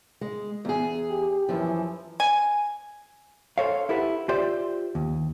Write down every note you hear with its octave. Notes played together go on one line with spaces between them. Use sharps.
G#3
E2 G#4
G4
F#2 E3 F3
G#5
A4 C5 C#5 F5
E4 G4 A4 B4 F#5
F4 G4 C5 D5 E5
D#2